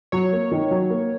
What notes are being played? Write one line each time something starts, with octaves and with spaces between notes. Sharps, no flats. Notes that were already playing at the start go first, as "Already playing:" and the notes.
F#3 C#5
A#3
D#3
F#3
A#3